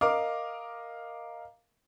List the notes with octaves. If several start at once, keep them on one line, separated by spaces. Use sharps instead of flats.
A#4 D#5 F5 D6